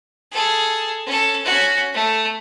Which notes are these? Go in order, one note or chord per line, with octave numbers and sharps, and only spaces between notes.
G#4 A4
C#4 A4
C#4 F#4
A3